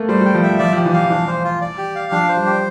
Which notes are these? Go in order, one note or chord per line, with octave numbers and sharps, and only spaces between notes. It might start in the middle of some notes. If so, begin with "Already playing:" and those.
Already playing: A3 A#3
G3 C5
G3
G5
F3
E5
F3 D5
F3
G4
E3
F3 F5
E3 D4
C5
F4
D5
G4
F5
F3 D4
C5
G3
G4